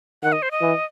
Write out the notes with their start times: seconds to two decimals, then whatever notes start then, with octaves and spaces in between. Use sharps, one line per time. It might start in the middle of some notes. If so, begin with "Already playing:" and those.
0.23 D#3 F#5
0.32 D#5
0.42 C5
0.51 D#5
0.61 E3